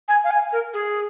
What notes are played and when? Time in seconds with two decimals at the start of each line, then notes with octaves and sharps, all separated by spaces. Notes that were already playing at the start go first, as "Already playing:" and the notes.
0.08 G#5
0.24 F5
0.31 G#5
0.52 A#4
0.73 G#4